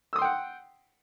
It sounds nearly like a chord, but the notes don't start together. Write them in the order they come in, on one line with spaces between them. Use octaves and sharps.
E6 D#6 C6 G5 F#5